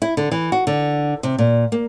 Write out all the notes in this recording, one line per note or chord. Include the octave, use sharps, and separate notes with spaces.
E4
D3
E3
F#4
D3
C3
A#2
A#3